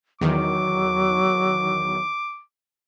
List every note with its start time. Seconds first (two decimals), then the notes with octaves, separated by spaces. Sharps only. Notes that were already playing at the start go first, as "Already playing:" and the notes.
0.21 E2 D#3 F#3 D6